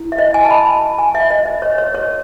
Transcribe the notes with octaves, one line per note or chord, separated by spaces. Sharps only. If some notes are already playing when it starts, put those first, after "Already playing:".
Already playing: E4
E5
D#5
G#5
A5
B5
A5
G#5
E5
D#5
D#5
C#5
C#5
C#5